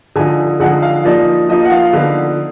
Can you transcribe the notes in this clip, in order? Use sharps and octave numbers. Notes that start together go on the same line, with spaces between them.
D3 F3 G#3 D#4 G#5
D3 F3 G#3 D#4 F#5
F5
F3 A#3 D#4 D5
F3 A#3 D#4 D#5
F#5
F5
D3 F3 B3 D#4